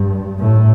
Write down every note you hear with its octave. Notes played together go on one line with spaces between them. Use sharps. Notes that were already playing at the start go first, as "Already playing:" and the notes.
Already playing: G2
A2